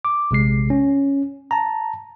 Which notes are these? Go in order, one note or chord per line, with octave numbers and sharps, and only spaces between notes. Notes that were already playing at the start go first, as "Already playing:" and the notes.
D6
A#1 C3 G#3 C7
C#4
A5 A#5